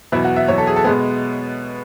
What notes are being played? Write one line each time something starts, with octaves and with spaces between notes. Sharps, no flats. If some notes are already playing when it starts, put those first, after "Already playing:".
E2 B2 F#3 E4
F#4
E5
E2 B2 F#3 C#5
A4
G#4
A4
B2 G#3 B3 G#4